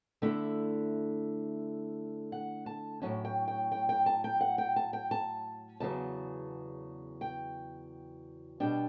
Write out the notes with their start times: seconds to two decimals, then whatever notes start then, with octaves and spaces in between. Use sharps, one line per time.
0.22 D3 A3 E4 E5
2.32 F#5
2.66 A5
3.02 A2 F#3 C#4 A5
3.25 G5
3.48 G5
3.72 G5
3.89 G5
4.06 A5
4.24 G5
4.41 F#5
4.58 G5
4.76 A5
4.93 G5
5.11 A5
5.80 E2 C#3 F#3 B3 A5
7.21 G5
8.60 B2 G3 D4 G5